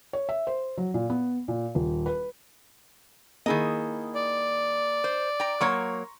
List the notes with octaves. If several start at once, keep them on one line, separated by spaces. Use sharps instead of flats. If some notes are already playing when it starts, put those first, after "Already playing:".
C#5
E5
C5
F#3
A#2
B3
A#2
D#1
B4
D#3 A#3 E4 G#4 D#5
D5
C5
G5 A#5
F#3 A#3 C#5 A#5 C6 C#6